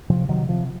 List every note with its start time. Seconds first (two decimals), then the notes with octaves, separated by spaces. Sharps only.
0.10 C3 F3
0.29 C3 D#3 F#3
0.49 C3 F3